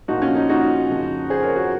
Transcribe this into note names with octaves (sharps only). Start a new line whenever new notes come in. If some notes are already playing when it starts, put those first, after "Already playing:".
A#2 F3 D#4 F#4
C#4 F4
D#4
D#4 F#4
F2 C#3 F3
G#4 C5
A#4 C#5
F#4 A#4